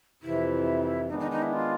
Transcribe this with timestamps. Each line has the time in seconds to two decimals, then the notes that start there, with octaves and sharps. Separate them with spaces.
0.23 F2 C3 E3 E4
1.09 D#3 G#3 B3 D4 D#4
1.20 D#4
1.31 D#4
1.42 E4
1.53 F4